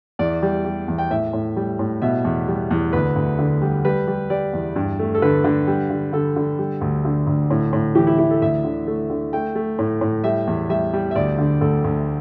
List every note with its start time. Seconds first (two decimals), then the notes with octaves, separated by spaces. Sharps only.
0.19 E2 D5
0.43 G3
0.65 G3
0.88 E2
0.98 G5
1.11 A2 E5
1.33 A2
1.56 G3
1.79 A2
2.02 B2 E5
2.25 E2
2.48 G3
2.71 E2
2.93 D2 B4
3.16 D2
3.39 D3
3.62 G3
3.85 G3 B4
4.07 G3
4.30 G3 D5
4.53 E2
4.76 G2
4.99 A3
5.15 A4
5.22 D3 B4
5.44 D3
5.68 G3
5.90 D3
6.13 D3 A4
6.36 D3
6.59 G3
6.81 D2
7.05 D3
7.27 D2
7.51 A2
7.73 A2
7.95 E3 G4
8.07 E4
8.18 E3 E4
8.31 A4
8.42 D2 E5
8.64 D3
8.87 A3
9.10 D3
9.33 A3 G5
9.56 A3
9.79 A2
10.01 A2
10.24 G3 E5
10.47 E2
10.69 G3 E5
10.93 G3
11.11 E5
11.16 D2 D5
11.39 D3
11.61 D2 A4
11.84 D2